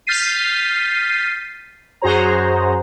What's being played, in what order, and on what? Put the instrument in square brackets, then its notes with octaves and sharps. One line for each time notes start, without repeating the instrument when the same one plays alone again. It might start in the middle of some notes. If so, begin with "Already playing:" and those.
[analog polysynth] F6 G6 A6 B6 C7 D#7
F#2 F#4 G#4 C5 A#5